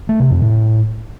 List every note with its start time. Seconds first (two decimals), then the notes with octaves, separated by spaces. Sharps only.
0.09 A3
0.20 C3
0.31 F2
0.42 A2